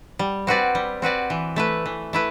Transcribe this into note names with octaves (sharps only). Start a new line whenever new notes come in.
G3
C4 F#4 B4 D5
G3
C4 F#4 B4 D5
E3
A3 E4 B4
E3
A3 E4 B4